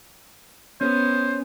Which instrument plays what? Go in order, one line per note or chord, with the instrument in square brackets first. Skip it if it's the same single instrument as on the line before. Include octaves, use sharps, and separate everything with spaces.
[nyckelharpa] B3 [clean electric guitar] C#4 [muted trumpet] C5